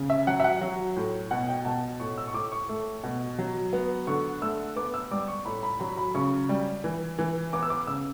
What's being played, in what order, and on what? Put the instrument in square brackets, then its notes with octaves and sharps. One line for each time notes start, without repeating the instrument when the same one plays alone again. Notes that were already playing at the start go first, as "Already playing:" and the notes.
Already playing: [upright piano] C#3
E5
F#3 F#5
E5
F#5
F#3
A2
B2 F#5
G5
B2 A5
A2 C#6
E6
C#6
A2 D6
C#6
A3
B2
F#3
B3
D3 C#6
A3 E6
B3 D6
E6
G3 D6
C#6
A2 B5
B5
F#3 B5
B5
C#3 C#6
G3
E3
E3
B3 D6
E6
D6
C#3 E6